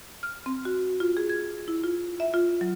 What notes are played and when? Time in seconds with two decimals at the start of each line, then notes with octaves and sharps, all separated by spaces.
0.23 F6
0.46 C4
0.65 F#4
1.00 F4
1.17 G#4
1.29 G#6
1.68 E4
1.84 F4
2.20 E5
2.34 F4
2.61 F#3